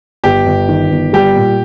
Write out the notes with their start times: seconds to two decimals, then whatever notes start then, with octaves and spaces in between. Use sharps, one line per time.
0.23 G1 G4
0.46 G1
0.69 D#3
0.90 G1
1.13 G3 G4
1.36 A#2